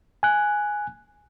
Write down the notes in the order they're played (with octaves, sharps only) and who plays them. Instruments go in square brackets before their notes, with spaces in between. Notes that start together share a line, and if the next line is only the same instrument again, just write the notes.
[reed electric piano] G#5 F#6